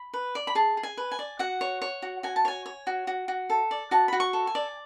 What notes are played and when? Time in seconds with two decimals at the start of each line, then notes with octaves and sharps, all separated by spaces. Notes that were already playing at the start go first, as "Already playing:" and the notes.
Already playing: B5
0.14 B4
0.35 D5
0.47 B5
0.55 G#4 A5
0.77 G#4
0.83 G#5
0.97 B4
1.12 G#5
1.19 D5
1.39 F#4 F#5
1.61 C#5
1.82 C#5
2.02 F#4
2.23 F#4 G#5
2.36 A5
2.45 C#5 G#5
2.66 C#5
2.87 F#4
3.07 F#4
3.28 F#4
3.50 A4
3.71 D5
3.91 F#4 A5
4.08 F#4 B5
4.20 C#6
4.33 A4
4.47 G#5
4.55 D5